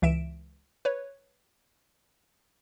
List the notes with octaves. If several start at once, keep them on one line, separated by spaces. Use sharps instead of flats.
C#2 E3 E5 D7 E7
B4 C#5